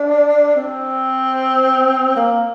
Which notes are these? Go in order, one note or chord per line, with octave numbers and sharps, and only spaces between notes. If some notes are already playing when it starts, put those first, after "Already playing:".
Already playing: D4
C4
A#3